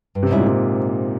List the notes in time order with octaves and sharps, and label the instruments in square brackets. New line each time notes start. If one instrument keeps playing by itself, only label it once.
[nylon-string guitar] G2
[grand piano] C3
[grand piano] G#2 [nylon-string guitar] G3 C#4 E4
[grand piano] A#2
C3